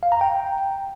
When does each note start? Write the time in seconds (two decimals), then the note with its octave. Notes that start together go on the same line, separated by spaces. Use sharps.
0.03 F5
0.12 A#5
0.21 G5